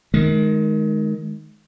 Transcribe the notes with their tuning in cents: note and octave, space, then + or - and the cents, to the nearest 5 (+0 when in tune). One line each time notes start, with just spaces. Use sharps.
D#3 +0 G#3 +30